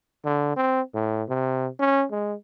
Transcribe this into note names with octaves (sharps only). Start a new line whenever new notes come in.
D3
C4
A2
C3
C#4
G#3